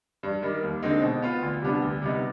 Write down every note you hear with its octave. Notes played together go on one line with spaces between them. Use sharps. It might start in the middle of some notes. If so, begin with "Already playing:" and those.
G2
D#3 G3
D#2
D3 G#3 C4 D#4
B2
B3 F4
D2
C3 G3 B3 D4
D2
C3 G3 B3 D#4